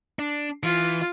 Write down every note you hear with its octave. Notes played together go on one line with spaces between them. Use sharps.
D4
E3 F4